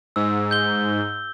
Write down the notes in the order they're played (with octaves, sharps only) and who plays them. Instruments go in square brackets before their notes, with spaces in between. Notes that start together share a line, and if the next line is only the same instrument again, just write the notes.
[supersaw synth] G#2 [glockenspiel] E6
[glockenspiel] G6 G7